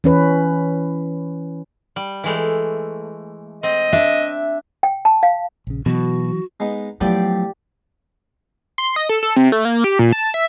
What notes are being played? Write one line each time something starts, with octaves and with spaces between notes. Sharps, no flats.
E3 C#4 B4
G3
E3 G#3 A3
C4 D#5
D4 E5
G5
A5
F5
A#1 C#3
B2 E3 F#3 F#4
G#3 B3 D#4
A2 F3 F#3 B3 G4 D5
C6
D#5
A4
A4
C3
A3
A#3
G4
A#2
A5
E5